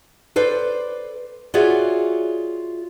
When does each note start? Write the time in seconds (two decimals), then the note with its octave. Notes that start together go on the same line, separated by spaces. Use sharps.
0.36 A4 B4 C5 D5
1.54 F4 F#4 G#4 C#5 D5 E5